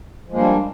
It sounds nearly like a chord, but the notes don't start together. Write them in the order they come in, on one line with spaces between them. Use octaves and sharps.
F3 G#3 A#3 G3 D4